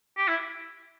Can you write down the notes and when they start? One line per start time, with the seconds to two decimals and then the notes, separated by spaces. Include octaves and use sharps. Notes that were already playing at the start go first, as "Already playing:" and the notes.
0.17 G4
0.28 E4